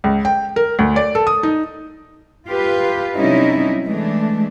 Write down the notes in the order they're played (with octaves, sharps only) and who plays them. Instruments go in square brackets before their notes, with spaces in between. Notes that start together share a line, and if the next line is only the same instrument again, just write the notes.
[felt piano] C#2
G5
A#4
D2
D5
A4
D#6
D#4
[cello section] F4 G4 B4
C3 F#3 G3 C#4 D#4 E4
E3 G#3 A3 D4